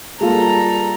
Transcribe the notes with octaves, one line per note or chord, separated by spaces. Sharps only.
G3 G#3 A#3 F4 A4 A#5